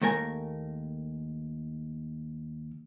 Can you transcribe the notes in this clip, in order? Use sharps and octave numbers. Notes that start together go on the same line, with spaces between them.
D#2 A3 A#4 G#5